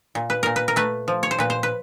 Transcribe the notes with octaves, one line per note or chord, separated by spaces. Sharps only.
A#2
B4
A#2 A#4
B4
A#4
A3 B4
F3
C#5
C5
A#2 B4
C5
B4